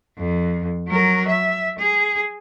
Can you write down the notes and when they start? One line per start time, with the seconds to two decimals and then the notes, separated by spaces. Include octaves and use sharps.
0.18 F2
0.88 F#3 A#4
1.27 E5
1.79 G#4